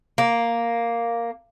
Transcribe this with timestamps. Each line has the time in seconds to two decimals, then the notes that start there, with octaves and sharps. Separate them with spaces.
0.18 A#3